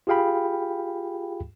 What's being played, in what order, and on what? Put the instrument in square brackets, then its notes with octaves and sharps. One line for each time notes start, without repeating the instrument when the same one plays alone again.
[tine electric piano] F4 G4 G#4 F5 G5 B5